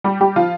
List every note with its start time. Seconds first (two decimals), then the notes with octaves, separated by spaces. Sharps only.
0.04 G3 G4
0.20 G3 G4
0.36 F3 F4